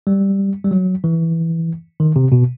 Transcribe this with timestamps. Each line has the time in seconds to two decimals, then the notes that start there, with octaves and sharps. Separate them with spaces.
0.07 G3
0.64 G3
0.71 F#3
1.04 E3
2.00 D#3
2.16 C3
2.32 B2